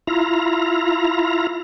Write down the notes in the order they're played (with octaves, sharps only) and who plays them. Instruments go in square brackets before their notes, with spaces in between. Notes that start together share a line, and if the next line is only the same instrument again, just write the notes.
[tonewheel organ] E4 F4 A#5